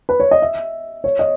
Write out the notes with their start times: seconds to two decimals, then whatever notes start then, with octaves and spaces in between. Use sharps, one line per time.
0.09 B4
0.20 C#5
0.31 D#5
0.42 E5
1.04 C#5
1.19 D#5